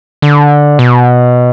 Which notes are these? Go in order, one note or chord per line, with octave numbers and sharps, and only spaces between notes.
D3
B2